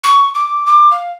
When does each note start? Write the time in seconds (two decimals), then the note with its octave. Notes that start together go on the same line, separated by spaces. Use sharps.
0.04 C#6
0.35 D6
0.67 D6
0.91 F5